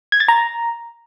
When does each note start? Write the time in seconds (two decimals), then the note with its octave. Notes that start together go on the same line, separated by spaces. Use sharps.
0.12 G#6
0.20 A6
0.28 A#5